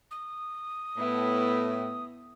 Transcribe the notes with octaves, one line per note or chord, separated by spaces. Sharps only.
D#6
A2 B3 E4